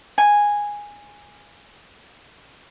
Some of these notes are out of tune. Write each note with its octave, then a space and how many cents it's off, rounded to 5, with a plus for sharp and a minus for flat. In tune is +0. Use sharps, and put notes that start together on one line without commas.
G#5 -10